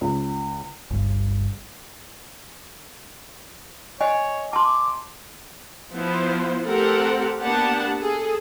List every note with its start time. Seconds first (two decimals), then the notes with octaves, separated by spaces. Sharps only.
0.01 C#2
0.90 G1 C#2 G2
4.01 C#5 D#5 G#5
4.53 A5 C6 D6
5.94 F3 B3 E4 C5
6.66 A3 C4 G4 A4 A#4 F#5
7.42 A#3 B3 D4 G4 F#5 A5
8.01 G#4 A4